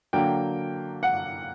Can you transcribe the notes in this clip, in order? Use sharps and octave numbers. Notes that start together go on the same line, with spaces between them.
D3 F#3 A#3 G5
F#5